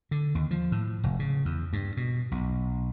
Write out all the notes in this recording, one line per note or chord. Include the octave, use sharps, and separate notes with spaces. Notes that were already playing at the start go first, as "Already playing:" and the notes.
D3
D#2
F3
A2
F1
C#3
E2
G2
B2
B1